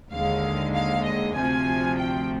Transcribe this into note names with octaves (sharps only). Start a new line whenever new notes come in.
D#2 D3 G#3 F5
F5
D#5
D2 C3 F3 G#5
G5